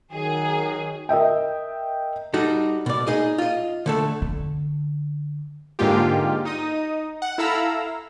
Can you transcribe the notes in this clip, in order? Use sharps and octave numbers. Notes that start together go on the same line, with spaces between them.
D#3 F#3 G#4
A#4 D#5 E5 G5
G3 D#4 F#4 A4
B2 D5
D#4 G#4 D#5
F4 D#5
D3 A3 A4
D3
G#2 D3 G#3 A#3 F4 G4
D#4 D#5 D#6
F#5
E4 A4 F5 A#5 B5 E6